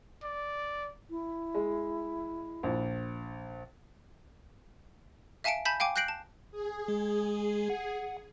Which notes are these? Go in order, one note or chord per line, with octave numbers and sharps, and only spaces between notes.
D5
E4
G#3
A#1
E5 F5 G#5 A5 C#7 D7
G#5 A5 B5 G6 B6
F5 G5 G#5 D6
F#6 G6 A#6 C7 D7 F#7
A5
G#4
G#3
F#5